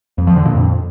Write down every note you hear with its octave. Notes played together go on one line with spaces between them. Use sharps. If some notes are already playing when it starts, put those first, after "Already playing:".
F2
F3
D3
A#2
F2